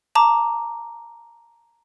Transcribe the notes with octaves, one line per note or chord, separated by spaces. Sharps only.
A5 A#5 D6